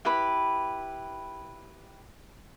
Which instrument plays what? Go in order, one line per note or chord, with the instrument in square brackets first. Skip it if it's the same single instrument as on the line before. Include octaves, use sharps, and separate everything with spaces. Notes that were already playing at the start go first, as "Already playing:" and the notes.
[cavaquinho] E4 G4 B4 B5